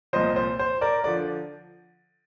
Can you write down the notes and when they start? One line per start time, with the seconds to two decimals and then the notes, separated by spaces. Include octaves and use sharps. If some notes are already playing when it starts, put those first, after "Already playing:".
0.13 C2 A#2 F3 C5 D#5
0.36 C5
0.59 C5
0.81 A#4 D5
1.04 D3 F3 D5